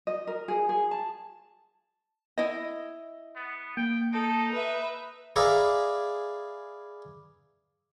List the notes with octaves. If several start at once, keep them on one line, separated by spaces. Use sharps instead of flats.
D#5
A#4
G#4
G#4
A5
E4 D#5
B3
A#3 G5
D#4 A4
B4 E5
G#4 B4 D5 E5 F5 A#5